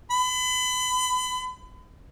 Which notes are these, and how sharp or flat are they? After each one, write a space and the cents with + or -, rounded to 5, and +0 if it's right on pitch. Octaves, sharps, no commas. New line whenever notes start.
B5 +35